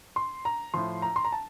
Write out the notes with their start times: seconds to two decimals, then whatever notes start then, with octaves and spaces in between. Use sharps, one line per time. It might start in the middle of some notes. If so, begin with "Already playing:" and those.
0.16 C6
0.45 A#5
0.74 A2 F3 C6
1.02 A#5
1.16 C6
1.25 A#5
1.32 A5